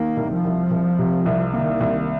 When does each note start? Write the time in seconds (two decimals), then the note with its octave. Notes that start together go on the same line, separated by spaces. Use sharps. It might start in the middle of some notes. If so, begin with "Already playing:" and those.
Already playing: D#3 A#3
0.17 C2
0.30 F3
0.44 C2
0.71 C2
0.99 C3
1.26 C2
1.53 D#3 A#3
1.80 C2